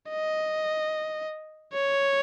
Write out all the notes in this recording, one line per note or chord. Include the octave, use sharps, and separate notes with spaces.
D#5
C#5